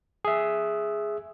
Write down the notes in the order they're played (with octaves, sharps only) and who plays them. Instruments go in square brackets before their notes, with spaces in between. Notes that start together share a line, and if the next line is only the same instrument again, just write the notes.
[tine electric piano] G#4 E5